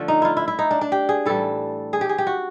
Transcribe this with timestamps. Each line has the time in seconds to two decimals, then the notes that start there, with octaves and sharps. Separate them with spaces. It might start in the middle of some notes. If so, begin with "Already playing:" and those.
Already playing: D3 F3 A3
0.08 D#4
0.22 E4 F4
0.37 E4
0.48 E4
0.59 D#4
0.71 D4
0.81 D4
0.92 G4
1.09 G#4
1.26 A2 E3 G3 A4
1.93 G#4
2.01 G4
2.09 G#4
2.18 G4
2.27 F#4